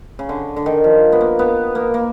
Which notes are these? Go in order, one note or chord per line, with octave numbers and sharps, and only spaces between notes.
C#3
D3
D3
D#3
F3
B3
A#3
B3
A#3
A#3